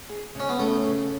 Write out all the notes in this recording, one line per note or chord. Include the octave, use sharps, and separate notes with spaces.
G#4
C#3 C#4
B3
A3 C#4
C#3